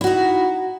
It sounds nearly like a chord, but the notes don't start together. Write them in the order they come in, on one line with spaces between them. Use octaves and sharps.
E4 F#4 D#4